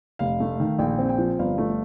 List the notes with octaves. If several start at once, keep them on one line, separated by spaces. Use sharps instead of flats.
F1 F5
A3
D#3
A#1 G5
C4
G5
F3
G1 F5
A3